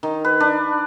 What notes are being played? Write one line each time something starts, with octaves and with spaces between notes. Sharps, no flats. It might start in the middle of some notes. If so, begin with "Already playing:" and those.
D#3
B4
D4